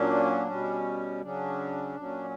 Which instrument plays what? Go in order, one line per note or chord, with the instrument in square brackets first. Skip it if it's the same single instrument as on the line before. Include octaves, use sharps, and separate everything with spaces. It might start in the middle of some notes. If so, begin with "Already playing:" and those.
Already playing: [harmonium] A#2 F#3 A#3 C#4 D4
B2 G3 C#4
C#3 F#3 C#4 D4
A#2 F#3 C#4